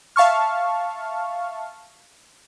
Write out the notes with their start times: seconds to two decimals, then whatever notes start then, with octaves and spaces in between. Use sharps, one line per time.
0.16 E5 F5 A5 C#6 F6